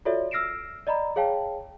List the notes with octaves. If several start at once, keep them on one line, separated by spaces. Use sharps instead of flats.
F4 F#4 A4 C#5 D5 E5
E6 F6 A#6 C7 D7 E7
D5 D#5 A#5 B5
G#4 C#5 F5 G5 A5